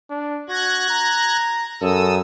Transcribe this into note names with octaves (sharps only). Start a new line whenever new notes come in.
D4
F#4 F#6 G#6 A#6
A#5
F#2 A4 D#6 E6